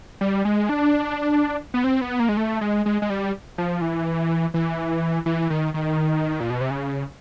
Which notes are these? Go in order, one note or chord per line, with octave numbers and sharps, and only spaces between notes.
G3
G#3
D4
B3
C4
B3
A#3
G#3
A3
G#3
G#3
G#3
G3
F3
E3
E3
E3
D#3
D#3
A#2
B2
C3
C#3